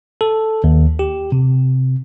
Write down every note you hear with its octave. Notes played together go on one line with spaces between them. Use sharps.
A4
D#2
G4
C3